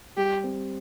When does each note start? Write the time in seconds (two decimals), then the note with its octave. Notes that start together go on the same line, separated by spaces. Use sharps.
0.17 G3 G4
0.44 C4